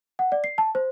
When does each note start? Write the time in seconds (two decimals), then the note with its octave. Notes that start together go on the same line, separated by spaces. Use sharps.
0.19 F#5
0.32 D5
0.44 C7
0.58 A5
0.75 C5